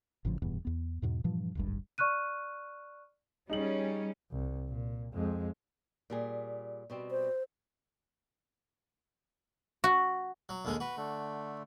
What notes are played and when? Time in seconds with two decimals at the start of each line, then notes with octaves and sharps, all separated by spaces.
0.25 G#1 A2 C#3 F3
0.42 D#1 E2 G2 B2
0.65 E2 B3
1.02 E2 G#2 B2
1.24 G2 A#2 E3 F3
1.55 D1 G#1 G2
1.98 D5 C#6 F6 F#6 D#7
3.50 G3 C#4 D#4 G#4 F#7
4.31 C2
4.68 A#2
5.13 F2 G#3
6.10 A#2 G3 G#4
6.90 B2 G3 C4
7.11 C5
9.84 F#4
10.49 F#3
10.65 D#2 D3 G#3
10.80 F#4 B4
10.97 D3 A3